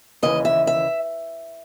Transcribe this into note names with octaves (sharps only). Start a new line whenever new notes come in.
D#2 C#3 E3 D#5
E5
E5